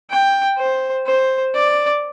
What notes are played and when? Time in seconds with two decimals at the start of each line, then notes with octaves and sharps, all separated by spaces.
0.10 G5
0.58 C5
1.06 C5
1.55 D5